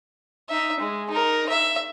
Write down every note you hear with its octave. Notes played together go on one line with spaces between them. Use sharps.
D#4 E5
G#3
D#4 A#4
E5